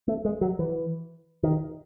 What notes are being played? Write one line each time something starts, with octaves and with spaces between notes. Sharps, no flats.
A3
G#3
F#3
E3
D#3